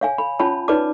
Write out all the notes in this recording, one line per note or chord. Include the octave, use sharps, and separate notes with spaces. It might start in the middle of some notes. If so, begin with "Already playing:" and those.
C#5 F5 G#5
B5
C#4 F4 C#5 A5 B5
D#4 B4 C#5 D5 A5 D6